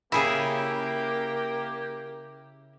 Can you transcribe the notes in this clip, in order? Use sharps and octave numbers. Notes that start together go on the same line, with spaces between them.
C#3 A#3 E4 G4 G#4 E5